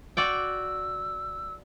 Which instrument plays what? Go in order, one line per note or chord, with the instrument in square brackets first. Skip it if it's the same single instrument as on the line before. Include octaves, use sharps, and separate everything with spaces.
[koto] F#4 D5 G5 [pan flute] E6